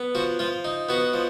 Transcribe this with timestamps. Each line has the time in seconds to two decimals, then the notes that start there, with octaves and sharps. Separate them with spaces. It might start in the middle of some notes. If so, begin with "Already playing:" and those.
Already playing: B3
0.15 F3 F#4
0.39 F3 F4
0.65 D#4
0.89 B3 F#4
1.13 F3